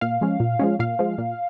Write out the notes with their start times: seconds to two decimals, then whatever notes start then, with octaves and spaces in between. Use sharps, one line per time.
0.01 A#2 F5
0.21 F3 G#3 C#4
0.40 A#2
0.59 F3 G#3 C#4
0.79 A#2 F5
0.99 F3 G#3
1.18 A#2